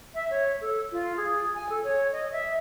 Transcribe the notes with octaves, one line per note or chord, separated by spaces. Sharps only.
E5
C#5
A4
F4
G#4
G#5
A4
C#5
D#5
E5